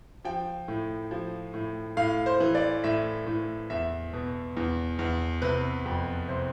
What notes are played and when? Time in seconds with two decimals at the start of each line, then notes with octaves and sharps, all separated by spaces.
0.25 F3 G5
0.68 A2
1.11 F3
1.54 A2
1.97 A2 F5
2.26 C5
2.40 E3
2.55 D5
2.84 A2 E5
3.27 A2
3.70 E2 E5
4.13 B2
4.57 E2
4.99 E2
5.42 C3 B4
5.85 F2
6.29 C3 C5